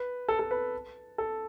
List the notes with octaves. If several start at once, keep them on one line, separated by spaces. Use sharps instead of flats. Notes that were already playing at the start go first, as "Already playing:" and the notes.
Already playing: B4
A4
A4
B4
A4